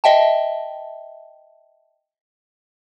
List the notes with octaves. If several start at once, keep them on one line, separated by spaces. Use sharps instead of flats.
D#5 E5 G5 A5